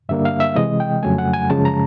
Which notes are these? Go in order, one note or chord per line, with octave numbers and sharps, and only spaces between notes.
G2 D3 G3 A#3 D4 E5
F5
E5
C3 E3 G#3 D#5
G5
F2 C#3 F#3 A3 G#5
F#5
G#5
F#2 C#3 F3 G#3 A5
A#5